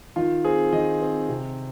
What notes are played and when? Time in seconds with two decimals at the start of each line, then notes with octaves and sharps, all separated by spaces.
0.16 D#3 F4
0.45 C4 G#4
0.73 D#3 D#5
1.02 C4
1.29 C3